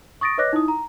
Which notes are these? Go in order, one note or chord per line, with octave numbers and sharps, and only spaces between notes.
C#6 D#6 A6 A#6 D7
B4 C#5 D#5 D6 F#6 A#6
D#4 E4 D#6
A#5